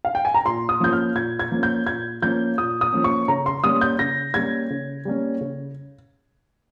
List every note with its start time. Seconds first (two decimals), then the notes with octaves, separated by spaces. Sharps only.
0.05 F5
0.15 G5
0.25 G#5
0.34 A#5
0.45 A#2 C6
0.69 D#6
0.80 F3 A#3 C#4 G6
0.93 F6
1.16 A#2 G#6
1.39 G#6
1.51 F3 A#3 C#4
1.63 G6
1.87 A#2 G#6
2.22 F3 A#3 C#4 G6
2.58 A#2 D#6
2.81 D#6
2.93 F3 A#3 C#4
3.04 C#6
3.28 C#3 A#5
3.46 C6
3.64 G3 A#3 C#4 D#6
3.81 G6
3.99 C#3 A#6
4.34 G3 A#3 C#4 G#6
4.70 C#3
5.05 G3 A#3 C#4
5.41 C#3